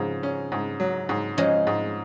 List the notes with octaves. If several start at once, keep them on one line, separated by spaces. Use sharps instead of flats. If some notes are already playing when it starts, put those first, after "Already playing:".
Already playing: G#2 C#3 F3
C#4
G#2
F#3
G#2
F3 G#3 C#4
G#2